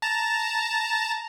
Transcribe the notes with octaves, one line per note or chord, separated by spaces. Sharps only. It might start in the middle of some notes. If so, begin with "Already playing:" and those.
A5 A#5